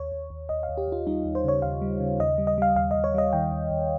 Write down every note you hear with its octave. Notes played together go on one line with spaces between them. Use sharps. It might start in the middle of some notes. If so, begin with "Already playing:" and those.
Already playing: D#2 C#5
D#2
D#2
D#2 D#5
F5
D#2
G4
D#2 F4
G3 D#4
D#2
C5
C#3 C#5
D#2 F5
G3
C#3
D#2 D#5
G3
D#5
G3 F5
D#2 F5
D#2 D#5
C#5
G3 D#5
D#3 G5
D#2
D#2